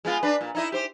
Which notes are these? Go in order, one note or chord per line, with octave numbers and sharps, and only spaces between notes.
G#3 B3 F4
D4 B4
A#2
D#4 E4 D#5
G4 C5